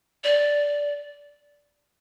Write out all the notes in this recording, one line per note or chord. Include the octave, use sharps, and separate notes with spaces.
D5